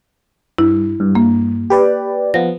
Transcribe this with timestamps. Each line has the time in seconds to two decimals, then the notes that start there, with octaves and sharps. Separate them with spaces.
0.58 G2 E4
1.00 G2
1.15 A#3
1.70 G4 B4 D5
2.34 F3 B3 A#6